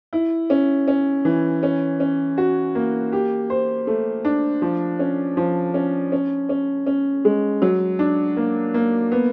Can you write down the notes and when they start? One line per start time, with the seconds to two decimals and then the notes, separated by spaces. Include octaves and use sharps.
0.13 E4
0.50 C#4
0.88 C#4
1.25 E3
1.63 C#4
2.00 C#4
2.38 F#4
2.75 A#3
3.12 G4
3.50 C5
3.87 A3
4.25 D4
4.62 F3
4.99 C#4
5.37 F3
5.74 C#4
6.12 C#4
6.49 C#4
6.86 C#4
7.25 G#3
7.62 F#3
7.99 D4
8.37 A#3
8.74 A#3
9.12 B3